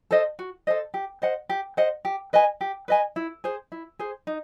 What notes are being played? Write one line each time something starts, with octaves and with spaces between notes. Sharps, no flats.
A4 C5 D#5
F#4
A4 C5 D#5
G4
C5 D#5 F#5
G4
C5 D#5 F#5
G4
B4 D#5 G#5
G4
B4 D#5 G#5
E4
G#4 C5
E4
G#4 C5
D#4